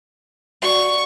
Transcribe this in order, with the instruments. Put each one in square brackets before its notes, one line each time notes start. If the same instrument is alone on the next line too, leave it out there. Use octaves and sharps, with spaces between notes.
[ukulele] F#4 D5 F#5 [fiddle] C#6